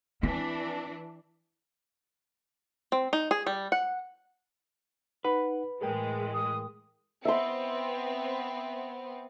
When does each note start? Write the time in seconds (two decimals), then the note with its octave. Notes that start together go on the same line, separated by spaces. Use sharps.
0.23 E3 C4 D4
2.92 C4
3.13 D#4
3.31 G#4
3.46 G3
3.72 F#5
5.24 D#4 B4 F#5
5.81 A2 E3 G#3 G#4 A#4 G5
6.34 D#6
7.25 B3 C4 E5 C6